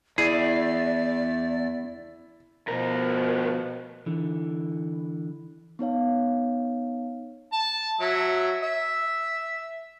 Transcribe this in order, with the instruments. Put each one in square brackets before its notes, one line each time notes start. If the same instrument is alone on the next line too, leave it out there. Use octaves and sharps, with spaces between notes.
[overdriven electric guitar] E2 [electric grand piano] E4 [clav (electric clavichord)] G#4 [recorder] D5
[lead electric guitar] D2 A#4 [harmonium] B2 F3
[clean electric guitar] D3 E3
[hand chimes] B3 D#4 C#5 F5
[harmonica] A5
F#3 E5
E5